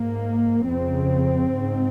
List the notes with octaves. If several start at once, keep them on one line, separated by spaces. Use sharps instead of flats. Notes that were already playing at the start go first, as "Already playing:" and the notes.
Already playing: G#2 A#3
F2 C#3 C4
G#2